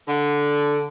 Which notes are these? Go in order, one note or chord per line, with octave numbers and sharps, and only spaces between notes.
D3